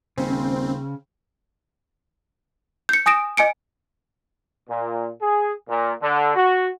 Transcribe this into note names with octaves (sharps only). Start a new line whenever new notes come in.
D#1 C#3 C4
G6 C#7
G#5 D#6 A#6 D7 E7
D#5 G#5 C#7 D7
A#2
G#4
A#2
D3
F#4